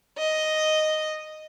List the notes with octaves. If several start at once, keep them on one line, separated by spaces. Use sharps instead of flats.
D#5